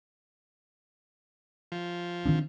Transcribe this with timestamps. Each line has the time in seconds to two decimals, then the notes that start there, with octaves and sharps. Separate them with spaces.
1.72 F3
2.26 D#3 C4 D4